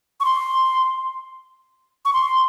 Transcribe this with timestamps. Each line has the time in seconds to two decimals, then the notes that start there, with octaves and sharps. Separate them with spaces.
0.20 C#6
0.25 C6
2.05 C#6
2.14 C6